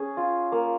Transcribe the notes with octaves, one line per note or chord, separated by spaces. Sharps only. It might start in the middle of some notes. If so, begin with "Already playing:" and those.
Already playing: C#4 G#4
F4
A#3